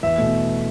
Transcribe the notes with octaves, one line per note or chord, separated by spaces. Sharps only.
E2 E5
B2 A3